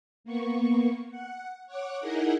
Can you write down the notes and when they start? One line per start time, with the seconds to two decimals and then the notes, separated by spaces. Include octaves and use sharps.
0.24 A#3 B3 C#6
1.11 F#5
1.67 C#5 F#5 D6
2.01 D#4 E4 G#4 A#4 D#5 F#5